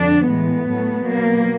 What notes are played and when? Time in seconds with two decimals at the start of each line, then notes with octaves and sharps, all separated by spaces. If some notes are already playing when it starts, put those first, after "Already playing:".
Already playing: F2 D3 F3 D4
0.27 A2 E3 G#3 B3
0.67 A2 F#3 A3
1.06 B2 F#3 A#3